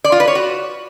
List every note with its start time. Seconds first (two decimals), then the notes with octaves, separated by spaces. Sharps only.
0.04 D5
0.12 F4
0.20 B4
0.28 C#5
0.35 F#4